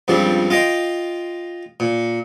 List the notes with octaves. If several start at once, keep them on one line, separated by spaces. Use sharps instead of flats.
C#2 G2 F3 G3 C4
F4 D#5 G5 C6
A#2